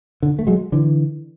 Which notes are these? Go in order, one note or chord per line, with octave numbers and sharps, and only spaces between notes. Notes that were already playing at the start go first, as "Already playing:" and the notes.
D3
A3
F#3 G#3
D3 E3